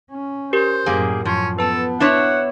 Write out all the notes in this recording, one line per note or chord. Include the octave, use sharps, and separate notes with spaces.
C#4
G4 A#4 C5
F#2 A2 G3 A#3 G#4
F#2 F3 C#4
B3 A4 B4 A5
D4 E4 C#5 F#5